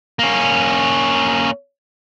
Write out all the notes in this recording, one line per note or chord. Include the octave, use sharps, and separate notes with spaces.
A#3 C#4